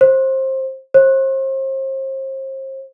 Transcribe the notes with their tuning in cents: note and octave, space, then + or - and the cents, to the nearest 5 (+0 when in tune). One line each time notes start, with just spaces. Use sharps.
C5 +20
C5 +35